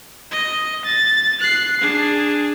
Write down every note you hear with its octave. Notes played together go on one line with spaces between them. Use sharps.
D#5
A6
F#6 C7
D4 G#4